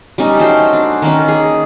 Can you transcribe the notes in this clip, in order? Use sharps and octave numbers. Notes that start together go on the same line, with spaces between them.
G3 C#4 D#4
A3 C#4 F#4 C5
D4
D#3 A#3 C#4
G#4